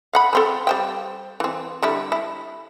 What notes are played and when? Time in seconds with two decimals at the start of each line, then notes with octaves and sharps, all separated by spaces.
0.13 F5 F#5 B5
0.33 F3 C4 A4
0.67 G3 C5 G5
1.40 E3 C4
1.82 D3 G3 E4
2.12 E4